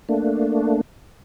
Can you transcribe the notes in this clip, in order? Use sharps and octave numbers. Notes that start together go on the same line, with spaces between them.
A3 A#3 D4